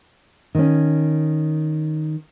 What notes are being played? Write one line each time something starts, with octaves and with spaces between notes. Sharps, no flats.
D#3 C#4